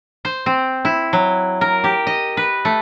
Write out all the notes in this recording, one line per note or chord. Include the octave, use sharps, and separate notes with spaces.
C5
C4
E4
F#3
A#4
G4
D#5
B4
A3